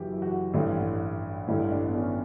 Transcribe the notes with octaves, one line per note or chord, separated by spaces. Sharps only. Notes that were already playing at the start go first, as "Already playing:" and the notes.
Already playing: F#1 F#2 C#3 E3 F#4 G4
E4
F#4
A1 G2 D3 E4
A1 G2 D3 E4
D4
B3
C#4